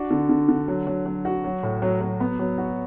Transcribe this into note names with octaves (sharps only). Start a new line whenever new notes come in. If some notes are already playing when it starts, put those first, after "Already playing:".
Already playing: D4 F#4
D3
D3
D3
F#3
F#3
F#3
F#4
F#3
A2
F#3
F#3
B3
F#3
F#4